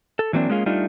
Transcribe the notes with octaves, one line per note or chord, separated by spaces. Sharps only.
A4
E3 F#3 A#3 C4 D4
G#3 A#3 C#4 F4 G#4
G3 A3 D4 D#4 F4